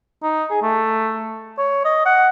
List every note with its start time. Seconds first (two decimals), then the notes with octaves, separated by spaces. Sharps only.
0.23 D#4
0.50 G#4
0.62 A3
1.58 C#5
1.85 D#5
2.06 F#5